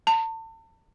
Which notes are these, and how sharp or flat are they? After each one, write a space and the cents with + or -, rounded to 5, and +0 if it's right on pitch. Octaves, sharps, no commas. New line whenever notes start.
A5 +40